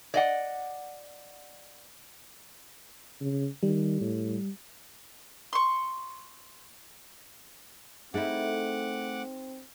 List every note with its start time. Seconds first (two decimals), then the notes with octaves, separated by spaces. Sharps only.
0.14 D5 D#5 F#5
3.21 C#3
3.63 D#3 G3
4.01 A2
5.53 C6 C#6
8.14 A3 C4 D#4 E4 G#4 F#5 D6